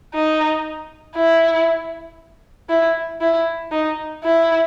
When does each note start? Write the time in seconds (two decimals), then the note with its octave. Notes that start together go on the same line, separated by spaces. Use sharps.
0.14 D#4
1.16 E4
2.69 E4
3.21 E4
3.72 D#4
4.24 E4